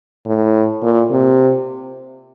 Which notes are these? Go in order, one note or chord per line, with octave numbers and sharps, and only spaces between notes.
A2
A#2
C3